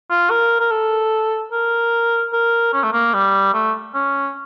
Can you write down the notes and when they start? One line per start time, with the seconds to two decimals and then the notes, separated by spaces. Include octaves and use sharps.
0.10 F4
0.30 A#4
0.60 A#4
0.71 A4
1.52 A#4
2.33 A#4
2.73 C#4
2.83 A3
2.93 A#3
3.14 G3
3.54 A3
3.94 C#4